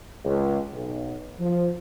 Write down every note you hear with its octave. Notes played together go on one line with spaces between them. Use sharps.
C#2
B1
F3